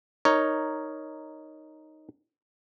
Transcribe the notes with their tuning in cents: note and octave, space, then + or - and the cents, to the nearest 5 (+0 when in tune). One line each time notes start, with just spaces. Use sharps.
D#4 +0 A#4 +0 C#5 +0